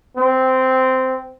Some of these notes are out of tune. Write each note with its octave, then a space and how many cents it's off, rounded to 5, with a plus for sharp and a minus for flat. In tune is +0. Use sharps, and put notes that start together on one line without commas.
C4 -10